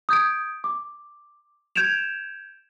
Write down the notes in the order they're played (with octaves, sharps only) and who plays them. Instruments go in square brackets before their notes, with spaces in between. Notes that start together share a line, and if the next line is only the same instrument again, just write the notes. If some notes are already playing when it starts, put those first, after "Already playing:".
[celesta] D#6 G6 G#6 D7
D6
G6 G#6 D7 E7 F7